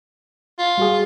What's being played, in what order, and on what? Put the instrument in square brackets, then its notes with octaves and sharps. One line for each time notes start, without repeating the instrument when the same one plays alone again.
[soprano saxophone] F4
[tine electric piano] G3 F#4 G#4